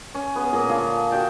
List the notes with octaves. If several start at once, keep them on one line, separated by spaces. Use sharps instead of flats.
C#4
B3 G#4
A#2 G#4 A#5
D3 F4 G#4 F5
D4 F#4 G5 A5